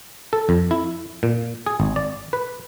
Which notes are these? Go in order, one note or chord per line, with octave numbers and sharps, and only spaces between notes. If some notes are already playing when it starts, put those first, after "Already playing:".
A4
F2
E4
A#2
G#4
G#1
D5
B4